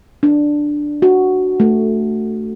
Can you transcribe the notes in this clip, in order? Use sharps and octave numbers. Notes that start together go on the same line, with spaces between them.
D4
F#4
A3